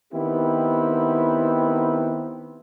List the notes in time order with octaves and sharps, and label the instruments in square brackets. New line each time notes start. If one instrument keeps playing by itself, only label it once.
[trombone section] D#3 B3 C4 E4 G4